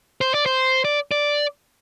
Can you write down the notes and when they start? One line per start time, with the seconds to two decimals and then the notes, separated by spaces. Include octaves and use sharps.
0.21 C5
0.34 D5
0.46 C5
0.85 D5
1.11 D5